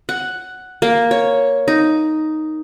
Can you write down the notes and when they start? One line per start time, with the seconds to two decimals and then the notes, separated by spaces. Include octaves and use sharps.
0.09 F#5
0.82 A#3
1.11 C#5
1.68 D#4